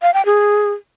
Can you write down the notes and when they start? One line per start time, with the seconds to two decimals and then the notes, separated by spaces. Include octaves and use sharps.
0.02 F5
0.14 G5
0.26 G#4